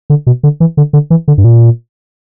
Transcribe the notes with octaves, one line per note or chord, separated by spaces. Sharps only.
D3
B2
D3
E3
D3
D3
E3
D3
G2
A#2